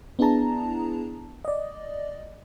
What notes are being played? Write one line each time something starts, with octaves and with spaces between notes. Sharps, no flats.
B3 D4 E4 G#4 A5 A#5
D5 D#5